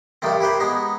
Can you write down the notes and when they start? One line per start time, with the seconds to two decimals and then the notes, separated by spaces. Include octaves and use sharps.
0.22 G2 C3 D#3 A3 C4
0.40 E4 G4 B4 C5
0.60 G#3 B3 D#4